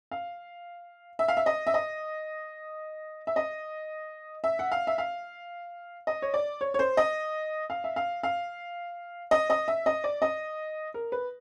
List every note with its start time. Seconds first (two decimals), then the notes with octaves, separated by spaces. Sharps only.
0.11 F5
1.19 E5
1.28 F5
1.37 E5
1.46 D#5
1.67 E5
1.74 D#5
3.27 E5
3.36 D#5
4.44 E5
4.59 F#5
4.72 F5
4.87 E5
4.98 F5
6.07 D#5
6.22 C#5
6.34 D5
6.61 C#5
6.74 C#5
6.79 C5
6.97 D#5
7.70 F5
7.84 E5
7.96 F5
8.23 F5
9.31 D#5
9.50 D#5
9.68 E5
9.86 D#5
10.04 D5
10.22 D#5
10.94 A#4
11.12 B4